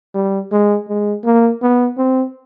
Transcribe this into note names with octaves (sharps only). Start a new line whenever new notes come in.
G3
G#3
G#3
A#3
B3
C4